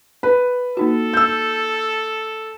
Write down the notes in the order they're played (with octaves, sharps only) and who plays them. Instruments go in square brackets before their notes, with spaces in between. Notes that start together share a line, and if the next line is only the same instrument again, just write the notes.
[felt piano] B4
[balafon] A#3 D#4 F#4 [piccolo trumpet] A4
[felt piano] E6 G6